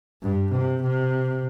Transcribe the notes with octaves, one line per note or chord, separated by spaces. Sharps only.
G2
C3
C3